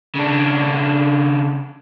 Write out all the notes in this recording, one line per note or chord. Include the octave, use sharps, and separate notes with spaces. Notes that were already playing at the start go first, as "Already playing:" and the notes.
C#3 D4